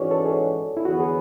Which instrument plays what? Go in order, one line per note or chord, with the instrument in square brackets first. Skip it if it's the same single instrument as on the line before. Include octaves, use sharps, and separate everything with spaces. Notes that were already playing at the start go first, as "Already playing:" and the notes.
Already playing: [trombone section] G#2 E3 G#3 C#4 F#4 [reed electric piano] C#5 D5
[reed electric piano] A4
G#4
E4
[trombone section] E2 D3 F#3 B3 [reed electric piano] F#4
[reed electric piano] G#4